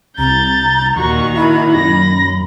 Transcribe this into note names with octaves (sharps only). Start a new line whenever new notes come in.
C2 A#5 G6 A6
D#2 A#2 D#3 F#4 C#6
E4 F#4 B5
F#2 A#6